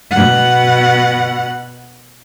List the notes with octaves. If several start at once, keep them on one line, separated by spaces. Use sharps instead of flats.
B2 F#5